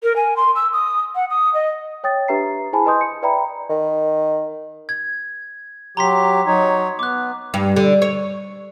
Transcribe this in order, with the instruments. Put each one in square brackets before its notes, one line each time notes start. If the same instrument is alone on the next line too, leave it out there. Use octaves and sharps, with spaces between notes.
[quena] A#4
G#5
C6
E6
D#6
F#5
D#6
D#5
[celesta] C#5 G5 D#6 A6
D4 G4 B4 E5 A#5 C7
E4 G#4 C5 G#5 A5 B5
B4 D#5 G#5 C6 D#6 G6
C#7
B4 D5 E5 G5 A#5 B5
[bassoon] D#3
[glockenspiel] G#6
[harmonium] F#3 G4 [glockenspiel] A#5 C6 B6
[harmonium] F#3 D#4 C#5
[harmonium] B3 [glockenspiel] D6 F#6
[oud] G2
D3
C#5